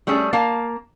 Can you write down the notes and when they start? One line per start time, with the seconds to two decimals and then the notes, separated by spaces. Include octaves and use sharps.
0.07 G3 A3 C#4 G#4
0.33 A#3 F5 A5